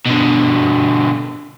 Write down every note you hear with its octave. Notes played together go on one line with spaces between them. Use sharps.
B2 D3